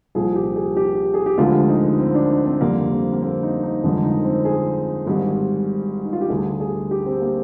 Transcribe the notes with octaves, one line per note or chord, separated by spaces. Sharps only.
C2 A#2 F3 G#4
G4
G#4
G4
G#4
G4
D2 D3 F3 G#3 F4
D#4
C4
D4
C4
F2 D3 G3 A#3
C4
A#3
C4
D#4
D#4
G1 F2 D3 F3 G#3 D#4
D#4
C4
G#4
G#1 G#2 G3
D#4
F4
G4
D2 D3 G3 G#4
G#4
G4
C4
A#3